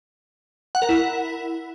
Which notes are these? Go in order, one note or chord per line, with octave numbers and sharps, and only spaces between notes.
F#5
A#4
E4